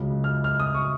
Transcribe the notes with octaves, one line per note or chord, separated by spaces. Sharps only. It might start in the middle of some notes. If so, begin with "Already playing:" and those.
Already playing: C#2 C#3 F#3
F6
F6
D#6
C#6